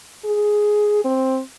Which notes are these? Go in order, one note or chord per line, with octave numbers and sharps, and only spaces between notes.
G#4
C4